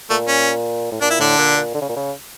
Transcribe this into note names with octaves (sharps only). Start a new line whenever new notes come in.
A#2 A3
C#4
A2
A#2 D4
E4
A2 D3 D4
A#2
A#2
D3
C#3
A#2
C#3